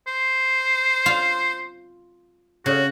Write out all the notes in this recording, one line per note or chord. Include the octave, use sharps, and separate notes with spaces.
C5
F4
C#3 F#4